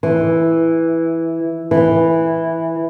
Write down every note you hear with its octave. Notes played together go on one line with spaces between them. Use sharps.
E3
E3